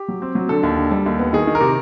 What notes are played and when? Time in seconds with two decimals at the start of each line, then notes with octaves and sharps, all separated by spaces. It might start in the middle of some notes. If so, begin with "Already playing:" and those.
Already playing: G4
0.08 F#3
0.22 C4
0.35 F#3
0.49 D3 A4
0.63 D#2
0.77 D3
0.91 G3
1.06 D#2
1.19 B3
1.33 D#3 G#4
1.47 D#3
1.55 A#4
1.61 C3